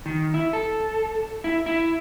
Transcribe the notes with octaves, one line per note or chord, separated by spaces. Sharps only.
D#3
E4
A4
E4
E4